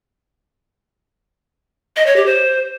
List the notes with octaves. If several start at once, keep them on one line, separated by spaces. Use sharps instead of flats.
D#5
C#5
G4
C5